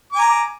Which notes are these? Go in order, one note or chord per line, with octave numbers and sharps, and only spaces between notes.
G#5 A#5 D6